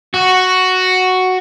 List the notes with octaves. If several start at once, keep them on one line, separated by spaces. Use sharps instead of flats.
F#4